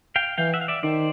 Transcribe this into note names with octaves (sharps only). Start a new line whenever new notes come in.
F5 G5
E3 F5 G5
E5 F#5
F5
D5 E5
D#3 C5 D5